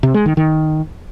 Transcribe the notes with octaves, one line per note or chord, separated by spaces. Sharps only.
C3
G#3
D#3
D#3